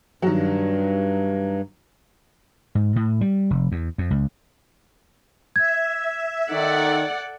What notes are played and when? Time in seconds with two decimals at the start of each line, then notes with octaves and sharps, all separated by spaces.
0.22 G2 D#3 F#3
2.75 G#2
2.96 A2
3.21 G3
3.50 F1
3.72 E2
3.98 F2
4.11 C#2
5.56 E5 G#6
6.50 D#3 D#4 A4 D5 F#5